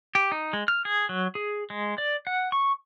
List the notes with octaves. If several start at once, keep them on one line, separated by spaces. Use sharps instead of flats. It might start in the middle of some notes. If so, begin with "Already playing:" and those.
G4
D#4
G#3
F6
G#4
F#3
G#4
G#3
D5
F#5
C#6